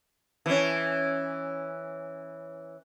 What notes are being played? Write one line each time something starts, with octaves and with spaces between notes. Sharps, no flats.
E3 C#4